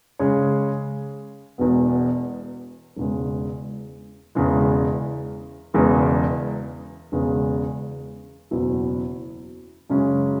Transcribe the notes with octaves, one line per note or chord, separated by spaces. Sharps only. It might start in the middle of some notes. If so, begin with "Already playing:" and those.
C#3 G#3 C#4 G#4 C#5
E1 E2 B2 B3
E1 E2 C#3 G#3
E1 E2 C#3 E3 G#3
E1 E2 C#3 E3 G#3
E1 E2 C#3 G#3
F#1 E2 B2 F#3 E4
F#2 C#3 G#3 C#4